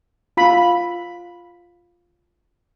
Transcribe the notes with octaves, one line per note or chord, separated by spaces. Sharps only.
F4 B5